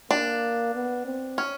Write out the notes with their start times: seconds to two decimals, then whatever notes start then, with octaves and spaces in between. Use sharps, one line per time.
0.11 A#3 D4
0.75 B3
1.05 C4
1.38 C#4